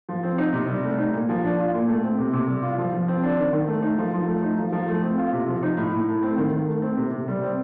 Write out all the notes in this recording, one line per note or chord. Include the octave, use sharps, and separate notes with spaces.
F3
C4
D#4
C3
G3
A3
D#4
A#2
F3
D4
F4
A#2
A3
C4
C3
C3
G3
F4
F3
F3
C4
D4
D#3
D#3
A3
D#4
F3
F3
A3
D#4
F3
F3
A3
C4
F4
C3
F3
D#4
A2
A2
A3
C4
D#3
D#3
A3
C4
C3
C3
G3
C4